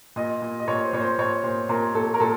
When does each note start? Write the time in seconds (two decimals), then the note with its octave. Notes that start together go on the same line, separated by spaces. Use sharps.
0.16 A#2 D#5
0.42 A#2
0.60 D#5
0.68 A#2 C#5
0.85 C5
0.93 A#2 C#5
1.01 C5
1.18 A#2 C#5
1.44 A#2 C5
1.69 A#2 A#4
1.95 A#2 A4
2.14 A#4
2.20 A#2 A4